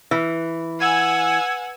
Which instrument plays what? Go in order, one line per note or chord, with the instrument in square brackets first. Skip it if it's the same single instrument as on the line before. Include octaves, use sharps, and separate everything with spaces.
[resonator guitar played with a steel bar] E3
[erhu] F#5 [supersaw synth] G#5 E6 G#6